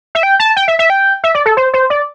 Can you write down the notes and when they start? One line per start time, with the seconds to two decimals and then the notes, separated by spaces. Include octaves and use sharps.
0.15 E5
0.23 G5
0.40 A5
0.56 G5
0.68 E5
0.79 E5
0.90 G5
1.24 E5
1.35 D5
1.46 A4
1.57 C5
1.73 C5
1.90 D5